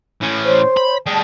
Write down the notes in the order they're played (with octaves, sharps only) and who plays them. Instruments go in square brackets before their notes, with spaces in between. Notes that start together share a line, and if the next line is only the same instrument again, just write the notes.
[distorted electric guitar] A2 C#4
[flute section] C5 C#5
[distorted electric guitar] B5
[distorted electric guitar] G3 G#4 [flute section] A5